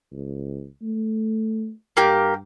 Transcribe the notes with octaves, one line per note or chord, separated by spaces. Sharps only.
C#2
A3
G2 A#3 G4